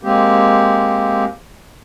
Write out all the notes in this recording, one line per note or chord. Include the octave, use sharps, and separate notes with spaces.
G#3 A#3 C4 G4